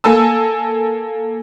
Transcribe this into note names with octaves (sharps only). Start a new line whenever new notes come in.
A#3 A4 G#5 A5 E6